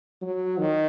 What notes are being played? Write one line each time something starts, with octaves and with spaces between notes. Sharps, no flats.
F#3
D#3